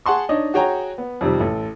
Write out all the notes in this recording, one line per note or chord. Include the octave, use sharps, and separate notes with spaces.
G#4 F#5 A5 C6 C#6
D4 D#4 C#5 D#5
F#4 G#4 C#5 G5 G#5 A#5
B3
F2 C3 D#3 G3
A1 A4